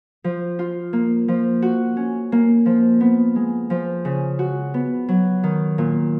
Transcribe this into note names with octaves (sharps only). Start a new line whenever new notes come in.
F3
F4
A#3
F3
F#4
C#4
A#3
F3
B3
G#3
F3
C#3
F#4
B3
F#3
D#3
A#2